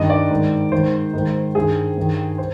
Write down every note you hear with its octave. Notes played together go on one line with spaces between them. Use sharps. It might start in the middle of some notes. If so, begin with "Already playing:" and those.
Already playing: G2 D#3 D#5
D5
G#2 D#3
G#2 D#3 C5
G#2 D#3
G2 D#3 G#4
G2 D#3
C5